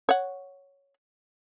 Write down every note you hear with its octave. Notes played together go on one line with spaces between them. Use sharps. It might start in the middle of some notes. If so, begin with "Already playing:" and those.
C#5 F#5